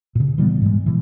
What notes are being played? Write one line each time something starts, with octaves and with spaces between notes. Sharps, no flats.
A#2 C#3
E3 G3 A#3 B3
G#2 G3 G#3
B2 E3